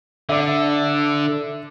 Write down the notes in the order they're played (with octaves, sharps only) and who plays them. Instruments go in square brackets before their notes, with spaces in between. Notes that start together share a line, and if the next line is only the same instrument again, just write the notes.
[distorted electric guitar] D3 [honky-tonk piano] D5 E5